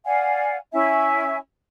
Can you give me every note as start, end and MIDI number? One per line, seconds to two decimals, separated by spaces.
0.04 0.55 74
0.04 0.55 77
0.04 0.55 78
0.04 0.55 80
0.72 1.37 61
0.72 1.37 64
0.72 1.37 76
0.72 1.37 80